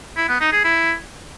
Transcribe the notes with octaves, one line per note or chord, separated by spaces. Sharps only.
E4
B3
D#4
G#4
E4